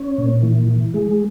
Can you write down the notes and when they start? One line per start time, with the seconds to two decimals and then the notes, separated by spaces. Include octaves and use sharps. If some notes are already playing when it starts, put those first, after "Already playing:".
Already playing: C#4
0.18 A#2
0.43 E3
0.68 E3
0.94 G#3